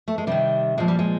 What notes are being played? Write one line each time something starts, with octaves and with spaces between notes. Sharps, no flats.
A3
G#3
C3 D#3 G3
A#2 F3 G#3
G3
G#3